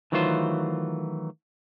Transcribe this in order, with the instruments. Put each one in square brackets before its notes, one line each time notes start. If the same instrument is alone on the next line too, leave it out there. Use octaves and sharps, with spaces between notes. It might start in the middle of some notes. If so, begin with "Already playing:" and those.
[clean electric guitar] D#3 E3 F#3 A3 F4 C5